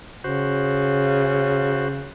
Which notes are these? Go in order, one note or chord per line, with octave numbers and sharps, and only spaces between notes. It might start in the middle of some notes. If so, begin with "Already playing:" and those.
C#3 F#4 C5